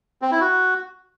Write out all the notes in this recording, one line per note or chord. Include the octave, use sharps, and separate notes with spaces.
C4
E4
F#4